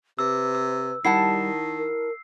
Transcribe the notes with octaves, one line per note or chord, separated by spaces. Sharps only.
C3 B4 E6
E6
D#3 G3 E4 F#5 A5 C7
A#4